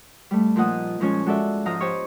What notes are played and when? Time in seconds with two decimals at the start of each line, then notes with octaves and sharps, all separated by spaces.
0.31 G3 A3
0.56 A#2 F3 A#3 D#4 F#5 D#6
1.00 A#2 F3 G#3 C#4 C#5 G#5
1.26 G#3 F#4 A4 D5 E5
1.66 G#2 F3 F5 A#5 D#6
1.81 G4 C5 C#5